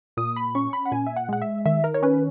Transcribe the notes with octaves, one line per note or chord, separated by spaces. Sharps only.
A#2 D#6
B5
C#4 C#6
B5
F#5
A#2 G#5
E5
F#5
G#3 F#5
E5
D#3 E5
A#4
C#5
C#4 B4